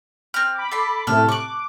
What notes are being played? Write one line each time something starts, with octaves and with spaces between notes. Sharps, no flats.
C4 F6
B5 D6
A4 C6
A2 C3 A3 A4 F6
C#6 D6 F#6